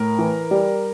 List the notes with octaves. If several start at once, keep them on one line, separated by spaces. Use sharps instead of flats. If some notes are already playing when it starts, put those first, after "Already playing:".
Already playing: A2 A#4
E3
G3